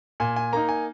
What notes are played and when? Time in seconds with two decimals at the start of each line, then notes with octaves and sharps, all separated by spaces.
0.20 A#2 G#5
0.36 G#5
0.53 A#3 D#4 A#5
0.69 G#5